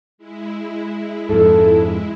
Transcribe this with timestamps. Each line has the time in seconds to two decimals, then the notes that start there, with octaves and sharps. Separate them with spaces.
0.18 G#3 E4
1.29 F2 G#2 A4